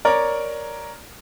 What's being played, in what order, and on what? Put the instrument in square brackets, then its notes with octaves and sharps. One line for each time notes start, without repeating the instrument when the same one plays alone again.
[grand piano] A#4 C#5 D5